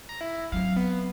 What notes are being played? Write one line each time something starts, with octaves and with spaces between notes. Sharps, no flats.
A#5
E4
F#3 C4 F5
B3